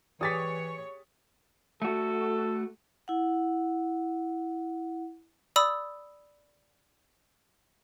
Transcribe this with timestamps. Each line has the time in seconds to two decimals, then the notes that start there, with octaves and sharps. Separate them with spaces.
0.21 E3 G4 G#4 C#5 D5 D#6 A6 B6
1.82 A3 F#4 A4
3.08 E4 F#5
5.56 D5 B5 D#6 E6